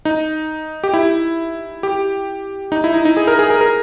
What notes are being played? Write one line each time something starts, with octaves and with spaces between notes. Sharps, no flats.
D#4
G4
E4
G4
D#4
E4
D#4
D#4
G#4
A#4
G#4
A#4
A#4